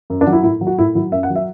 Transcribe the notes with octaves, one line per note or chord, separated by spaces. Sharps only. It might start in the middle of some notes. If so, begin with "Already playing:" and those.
F#2
D4
F#3
E4
A2 E4
F#3
F#4
A2 E4
F#3 E4
F#2 E5
F#5
F#3
E5